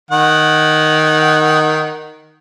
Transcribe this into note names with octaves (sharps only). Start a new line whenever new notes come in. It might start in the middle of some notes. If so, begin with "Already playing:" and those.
D#3 F#5